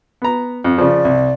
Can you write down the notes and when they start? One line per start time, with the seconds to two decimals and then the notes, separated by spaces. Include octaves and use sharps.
0.22 B3 A#5
0.64 F2
0.78 C#3 F3 D5
1.05 C2